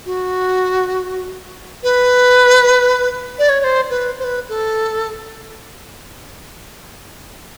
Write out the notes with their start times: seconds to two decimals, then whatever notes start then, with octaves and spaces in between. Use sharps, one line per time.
0.06 F#4
1.83 B4
3.39 D5
3.49 C#5
3.60 C#5
3.64 C5
3.90 B4
4.19 C5
4.24 B4
4.49 A4